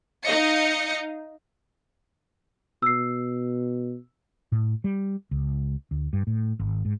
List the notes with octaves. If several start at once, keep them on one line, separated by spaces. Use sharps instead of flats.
D#4 D#5 F5 C#7
B2 E6 C7
A2
G3
C#2
D2
G2
A2
G#1
G#2